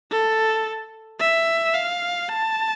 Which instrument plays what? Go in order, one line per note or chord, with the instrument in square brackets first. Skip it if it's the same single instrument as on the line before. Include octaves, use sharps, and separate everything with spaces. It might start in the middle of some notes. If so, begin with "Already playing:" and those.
[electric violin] A4
E5
F5
A5